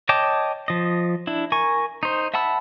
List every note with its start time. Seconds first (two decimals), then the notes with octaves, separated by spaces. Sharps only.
0.09 C#5 D#5 G5 A5 D6
0.68 F3 D#5
1.27 D4 E4
1.52 A#4 G#5 C#6
2.03 D#4 C5
2.34 E5 F#5 A5 B5 E6